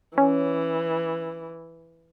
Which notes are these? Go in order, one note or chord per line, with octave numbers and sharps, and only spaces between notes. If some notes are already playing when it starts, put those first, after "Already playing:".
E3 C#4